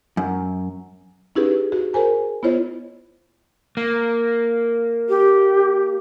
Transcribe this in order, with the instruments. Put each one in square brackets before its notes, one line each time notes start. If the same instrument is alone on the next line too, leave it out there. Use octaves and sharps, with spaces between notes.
[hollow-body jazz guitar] F#2
[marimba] C#4 D#4 E4 G4 G#4 B4
F#4 G#4
G#4 A#4 C5 G#5 A#5
B3 E4 F4 C5 C#5 D#5
[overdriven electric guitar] A#3
[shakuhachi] G4